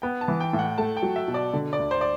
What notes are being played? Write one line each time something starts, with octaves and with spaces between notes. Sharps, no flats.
B3 G5
A5
E3
G5
A2
F#5
A3 A5
G5
F#3
E5
B2
D5
D3
D5
D2
C5
D5